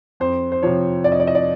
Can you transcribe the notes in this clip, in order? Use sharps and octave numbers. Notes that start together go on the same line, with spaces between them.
F2 C5
C5
C3 F3 C#5
F2 D5
D#5
D5
D#5
D5